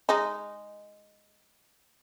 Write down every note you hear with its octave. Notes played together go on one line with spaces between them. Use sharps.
G#3 D#4